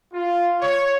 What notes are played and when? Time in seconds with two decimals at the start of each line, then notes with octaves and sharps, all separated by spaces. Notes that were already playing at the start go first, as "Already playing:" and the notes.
0.13 F4
0.61 C#5